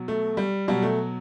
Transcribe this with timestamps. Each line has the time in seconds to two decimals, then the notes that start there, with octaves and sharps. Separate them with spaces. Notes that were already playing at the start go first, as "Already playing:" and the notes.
Already playing: B2 F#3
0.08 A3
0.37 G3
0.68 B2 F#3 G3
0.83 A3